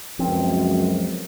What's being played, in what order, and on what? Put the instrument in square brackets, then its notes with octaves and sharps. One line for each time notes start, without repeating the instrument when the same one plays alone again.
[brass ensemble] C#2 F#2 [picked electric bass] F3 C4